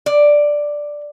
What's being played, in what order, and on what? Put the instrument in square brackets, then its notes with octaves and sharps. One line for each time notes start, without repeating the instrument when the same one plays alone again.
[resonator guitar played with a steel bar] D5